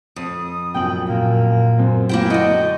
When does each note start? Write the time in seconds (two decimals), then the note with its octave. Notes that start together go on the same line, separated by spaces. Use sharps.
0.16 F2 D#6
0.74 A#1 F#2 G5 F#7
1.09 A#2 A#3
1.78 F#2 C4
2.09 A#3 E4 G5 G6
2.30 D3 F#4 D#5